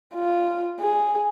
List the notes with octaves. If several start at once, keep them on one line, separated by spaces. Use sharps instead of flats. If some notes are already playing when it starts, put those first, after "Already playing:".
F4
G#4